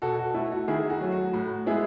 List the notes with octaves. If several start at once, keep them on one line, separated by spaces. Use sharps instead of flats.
B2 F#4 A4
F#4
A3 E4
F#4
D#3 E4 G#4
F#4
F#3 A3
F#4
A2 F#4
G#3 B3 E4 G#4